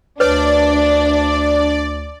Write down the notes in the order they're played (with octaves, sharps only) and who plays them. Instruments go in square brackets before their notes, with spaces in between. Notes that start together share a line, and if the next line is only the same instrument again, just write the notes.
[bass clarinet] D2 [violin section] D4 [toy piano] B4 C#5 [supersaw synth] D5